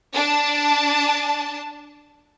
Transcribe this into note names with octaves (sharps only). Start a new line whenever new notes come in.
D4 A5